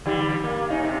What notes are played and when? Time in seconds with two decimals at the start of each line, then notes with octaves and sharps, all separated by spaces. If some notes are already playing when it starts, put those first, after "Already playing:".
0.06 D3 G3 G4
0.44 A#3
0.70 C#4 D#4
0.83 C3